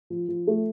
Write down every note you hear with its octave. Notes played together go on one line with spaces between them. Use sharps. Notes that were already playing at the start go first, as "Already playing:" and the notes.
F3
F3
A3